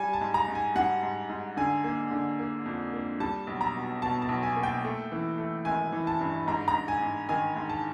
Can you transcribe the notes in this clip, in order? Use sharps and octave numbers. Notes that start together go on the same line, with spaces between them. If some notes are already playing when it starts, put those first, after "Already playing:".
Already playing: G3 G#5
A5
G#2
A#5
G#2
G#5
G3 F#5
G#2
G#2
D3 G#5
A#3
D3
A#3
F2
A#3
G3 A5
B1
A#5
B2
B2 A5
A5
B1
G#5
A#3
G5
A3
E3
A3
G#1 G#5
E3
A5
G2
G#2 A#5
A#5
G#2
G#5
G#2
D#3 G#5
G#2
A5